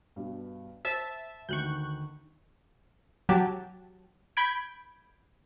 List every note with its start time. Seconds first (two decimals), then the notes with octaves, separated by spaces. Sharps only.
0.16 G2 B2
0.85 C5 E5 A5
1.49 D2 D#3 C#6 F#6 G6
3.29 F#3 G4 A5
4.37 B5 G6 G#6 D7